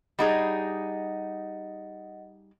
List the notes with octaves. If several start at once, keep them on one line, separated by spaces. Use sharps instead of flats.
G3 D#4 G#4 D#5 F#5 A6